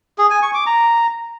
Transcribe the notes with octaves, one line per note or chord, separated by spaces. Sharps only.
G#4
G#5
C#6
D6
A#5